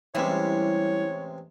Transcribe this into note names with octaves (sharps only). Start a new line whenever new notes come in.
A1 C3 G3 G#3 D4 E4 C#5